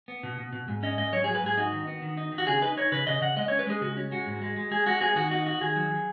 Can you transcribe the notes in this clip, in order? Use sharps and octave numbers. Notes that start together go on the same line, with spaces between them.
B3
B2
B2
B2
G#2
C#4 D#5
G#2 D#5
F#3 C#5
F#3 G#4
B4
G#2 G#4
D#4 F#4
D#3
B3
D#3
D#4
D#3
F#4
C#3 G#4
D#4 B4
D#4 C#5
C#3 B4
C#3 D#5
C#3 F#5
G#3 D#5
C#4 C#5
B4
G#3 G#4
C#3 F#4
C#4
G#3 F#4
G#2
G#3
G#3
G#3 G#4
G#3 F#4
B3 G#4
D#3 F#4
D#4 F#4
D#4 F#4
D#3 G#4
F#3
F#3